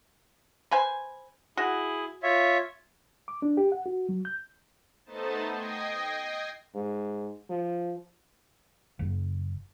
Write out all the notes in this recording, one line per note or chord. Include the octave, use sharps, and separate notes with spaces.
B4 C5 G#5
E4 F#4 G#4
F4 C#5 E5
D6
D4
G4
F#5
F#4
F#3
G6
A3 B3 D#4 C5 A5
D#5 G5 G#6 A#6 C7
G#2
F3
F#1